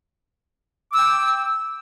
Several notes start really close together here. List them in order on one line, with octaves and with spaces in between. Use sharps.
D6 E6 G5